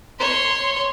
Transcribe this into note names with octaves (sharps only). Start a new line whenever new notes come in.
C#5 C6